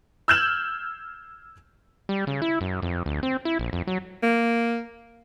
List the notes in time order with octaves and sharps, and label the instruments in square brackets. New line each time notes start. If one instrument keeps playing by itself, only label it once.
[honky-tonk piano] E6 F6 G6 G#6 E7 F#7
[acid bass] G3
C#3
E4
F#2
F2
D2
C4
E4
A#1
F2
F#3
[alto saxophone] A#3